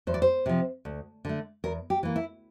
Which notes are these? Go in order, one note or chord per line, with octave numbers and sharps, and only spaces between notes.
E2 C5
D5
C5
C3 F3
D2
D3 A3
E2 A#4
G4
E3 A#3
E4